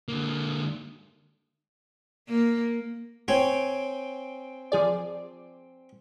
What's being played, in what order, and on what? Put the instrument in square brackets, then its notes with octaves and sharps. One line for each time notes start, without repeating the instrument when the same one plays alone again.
[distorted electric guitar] D3 A#3
[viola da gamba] A#3
[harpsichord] C4 G5 G#5 [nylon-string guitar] C#5
[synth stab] F3 G#4 D5